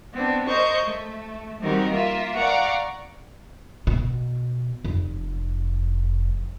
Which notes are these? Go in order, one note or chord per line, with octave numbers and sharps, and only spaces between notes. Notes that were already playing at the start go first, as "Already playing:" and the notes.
B3 C4 D4
A#4 C5 D#5 C#6 G6
A3
D#3 G3 C4 D#4 F#4 A#4
A#3 F4 A#4 E5
D5 F5 F#5 A#5 C#6
B2
F1